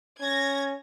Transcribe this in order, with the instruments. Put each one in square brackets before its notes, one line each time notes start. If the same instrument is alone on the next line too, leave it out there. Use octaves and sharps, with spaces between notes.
[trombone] C#4 [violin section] G#6 A#6